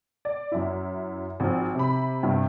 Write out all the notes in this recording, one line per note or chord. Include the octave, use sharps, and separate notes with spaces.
D5
F#2 E4
G#1 F3
C3 B5
G2 C3